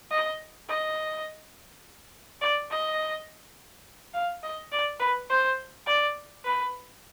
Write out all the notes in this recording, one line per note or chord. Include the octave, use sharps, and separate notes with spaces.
D#5
D#5
D5
D#5
F5
D#5
D5
B4
C5
D5
B4